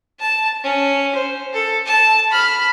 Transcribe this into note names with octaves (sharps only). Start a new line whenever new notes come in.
A5
C#4
C5
A4
A5
B5 F6